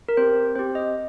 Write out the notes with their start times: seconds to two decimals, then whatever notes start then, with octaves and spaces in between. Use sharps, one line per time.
0.09 A#4
0.17 C4 G4 C5
0.55 C4 G4 C5
0.75 D#5